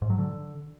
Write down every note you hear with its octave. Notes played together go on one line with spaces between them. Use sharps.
G#2
F#3
D3